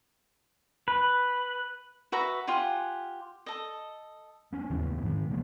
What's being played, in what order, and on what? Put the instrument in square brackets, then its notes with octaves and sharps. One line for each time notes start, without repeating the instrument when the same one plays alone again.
[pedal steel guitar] B4
[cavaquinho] F#4 B4 E5 A#5
F4 G4 F#5 G#5
A4 D#5
[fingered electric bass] B3 C#4 D4
D#2 C#3 E3 B3
G#2 D#3
C3 F3 G#3 A#3